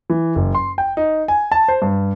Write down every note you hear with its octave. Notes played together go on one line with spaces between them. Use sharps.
E3
F#1
C6
G5
D#4
G#5
A5
C5
G2